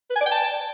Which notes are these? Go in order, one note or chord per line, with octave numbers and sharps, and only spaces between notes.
B4
G#5
D5
G5
A5